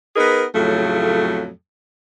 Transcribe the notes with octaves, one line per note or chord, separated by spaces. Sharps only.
B3 D#4 G#4 A#4 B4
F2 A2 C#3 F#3 A3